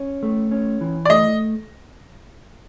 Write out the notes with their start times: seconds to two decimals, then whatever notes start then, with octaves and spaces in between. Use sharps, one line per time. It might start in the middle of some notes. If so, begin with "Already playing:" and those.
Already playing: C#4
0.23 A3
0.51 C#4
0.81 E3
1.05 D5
1.10 A3 D#5